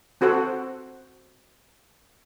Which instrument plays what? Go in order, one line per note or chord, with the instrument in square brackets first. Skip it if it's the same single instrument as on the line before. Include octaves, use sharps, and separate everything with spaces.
[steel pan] C4 F#4 A4 C5 F#5